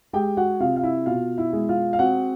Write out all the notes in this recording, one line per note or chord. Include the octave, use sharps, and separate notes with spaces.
G#3 G4 G5
F#4 F#5
C3 F4 F5
F5
E4 E5
B2 F4 F5
E4 E5
G#3
F4 F5
F5
C4 F#4 F#5